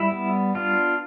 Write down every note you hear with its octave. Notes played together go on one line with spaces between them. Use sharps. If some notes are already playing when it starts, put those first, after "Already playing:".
Already playing: G3 E4
B3
D4 F4